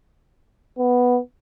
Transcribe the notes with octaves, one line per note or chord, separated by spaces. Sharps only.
B3